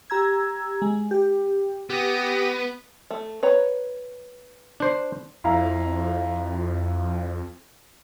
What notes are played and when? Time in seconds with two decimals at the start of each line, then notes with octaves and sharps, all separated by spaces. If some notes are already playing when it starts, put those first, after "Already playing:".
0.10 G4 A#5 E6 G#6
0.82 G#3
1.11 G4
1.90 B3 G4 D#6 A#6
3.11 A3
3.43 B4 C#5 A#5
4.80 D4 C5
5.44 F2 E4 F5 A#5